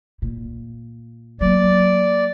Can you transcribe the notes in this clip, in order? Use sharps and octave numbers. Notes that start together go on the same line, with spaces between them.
A#2
F#3 A#3 D5